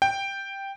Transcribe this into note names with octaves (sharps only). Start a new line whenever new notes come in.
G5